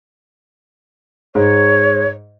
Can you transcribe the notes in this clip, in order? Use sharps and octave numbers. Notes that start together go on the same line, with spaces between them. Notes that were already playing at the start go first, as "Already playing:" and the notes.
G#2 C#5